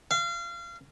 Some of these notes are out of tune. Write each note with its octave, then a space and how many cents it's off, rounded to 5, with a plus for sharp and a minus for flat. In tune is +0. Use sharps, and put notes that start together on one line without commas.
F5 -30